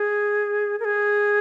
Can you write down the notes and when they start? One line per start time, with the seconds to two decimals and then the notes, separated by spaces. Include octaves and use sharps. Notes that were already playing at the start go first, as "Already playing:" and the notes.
Already playing: G#4
0.80 A#4
0.85 G#4